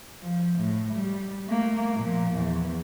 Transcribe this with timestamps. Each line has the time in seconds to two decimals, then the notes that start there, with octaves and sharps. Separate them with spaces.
0.23 F3
0.59 A2
0.94 G3
1.48 A3 A#3
1.96 A#2 F3
2.35 E2